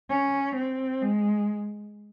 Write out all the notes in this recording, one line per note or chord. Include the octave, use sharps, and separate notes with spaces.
C#4
C4
G#3